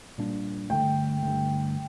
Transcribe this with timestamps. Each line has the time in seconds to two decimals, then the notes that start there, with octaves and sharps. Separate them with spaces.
0.18 A#2 G3 A#3 D4
0.70 G2 D3 A3 G5
1.22 G2 D3 A3